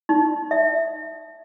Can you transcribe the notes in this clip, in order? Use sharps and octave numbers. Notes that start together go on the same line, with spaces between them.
D#4
E5